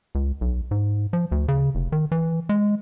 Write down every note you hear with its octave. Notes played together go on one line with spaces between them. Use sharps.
C#2
B1
G#2
F3
D2
C#3
F1
D#3
E3
G#3